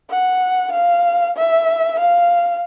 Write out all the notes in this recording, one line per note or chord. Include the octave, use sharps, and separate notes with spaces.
F#5
F5
E5
F5